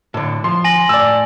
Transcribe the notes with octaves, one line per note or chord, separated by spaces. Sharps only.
A2 D3
F3 C6
G#5 A#6 F#7
A2 D5 E6